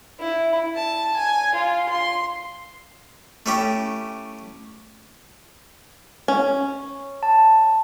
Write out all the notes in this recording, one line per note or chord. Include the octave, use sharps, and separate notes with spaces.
E4
A5
G#5
F4
C6
A3 C#4 E4 G4
C#4
A5